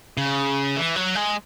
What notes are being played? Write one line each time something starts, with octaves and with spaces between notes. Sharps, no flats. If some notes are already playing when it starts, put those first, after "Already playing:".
C#3
E3
F#3
G#3